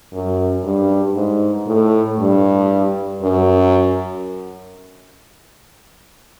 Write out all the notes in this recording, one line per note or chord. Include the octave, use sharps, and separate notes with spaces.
F#2
G2
G#2
A2
G2
F#2